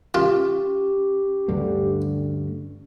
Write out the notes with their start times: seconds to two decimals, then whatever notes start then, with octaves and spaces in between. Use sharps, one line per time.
0.14 C#4 F4 G4
1.48 D2 G2 D3